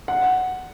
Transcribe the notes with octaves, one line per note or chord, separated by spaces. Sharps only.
F#5